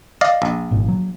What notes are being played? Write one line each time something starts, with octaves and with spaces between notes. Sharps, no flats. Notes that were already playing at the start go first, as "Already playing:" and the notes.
D5 D#5 F5
A#1
G#1 A#2
F#3